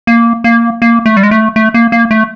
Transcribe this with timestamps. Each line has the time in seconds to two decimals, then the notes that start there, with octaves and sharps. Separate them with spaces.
0.07 A#3
0.44 A#3
0.82 A#3
1.06 A3
1.17 G3
1.23 G#3
1.31 A3
1.56 A3
1.74 A#3
1.92 A#3
2.11 A3